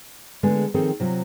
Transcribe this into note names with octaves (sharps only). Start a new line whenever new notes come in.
D3 G#3 A3 B3 G#4
D#3 F3 C4 G#4 A4
C3 F#3 F4